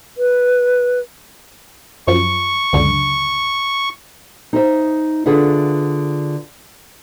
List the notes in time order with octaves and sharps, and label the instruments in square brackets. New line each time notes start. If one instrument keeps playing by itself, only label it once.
[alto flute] B4
[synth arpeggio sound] F#2 F3 [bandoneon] C#6
[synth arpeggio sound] C#2 F#2 D3
[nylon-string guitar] D#4 C5 E5
D3 F4 G#4 B4 E5 F#5